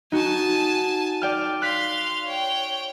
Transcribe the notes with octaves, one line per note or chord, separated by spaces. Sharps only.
D#4 F#4 G#5 A5
D5 G5 F6
F5 C6 F#6 B6
C#5 G5